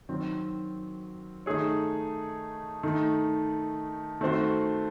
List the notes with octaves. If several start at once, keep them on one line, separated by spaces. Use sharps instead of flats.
D#3 F#3 C4
D#3 A3 D#4 G#4 C#5
D#3 A3 D#4
D#3 A3 C4 F#4 C5